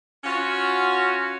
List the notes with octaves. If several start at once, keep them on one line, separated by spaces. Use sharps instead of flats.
C#4 F4 F#4